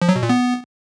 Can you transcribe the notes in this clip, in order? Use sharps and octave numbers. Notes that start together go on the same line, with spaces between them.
F3
F#3
B2
A#2
B3